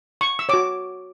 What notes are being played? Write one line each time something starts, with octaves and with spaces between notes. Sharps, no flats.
C#6
E6
F#4 C#5 D6